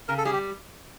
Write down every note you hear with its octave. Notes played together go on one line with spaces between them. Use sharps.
C#3 A#4
A4
G3 G#4
G4